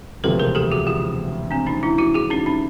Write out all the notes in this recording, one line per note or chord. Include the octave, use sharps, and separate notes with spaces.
E1 D2 C3 F3 A4 B4
G#4 A#4
G4 A4
F#4 G#4
F4 G4
C4 D4
C#4 D#4
D4 E4
E4 F#4
F#4 G#4
C#4 D#4
C#4 D#4